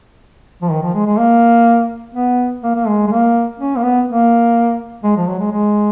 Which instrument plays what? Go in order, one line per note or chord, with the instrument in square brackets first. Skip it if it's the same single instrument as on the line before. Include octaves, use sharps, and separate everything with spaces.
[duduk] F3
D#3
F3
G#3
G#3
A#3
B3
A#3
A#3
G#3
G#3
A#3
C#4
A#3
B3
A#3
G#3
F3
F#3
G#3
G#3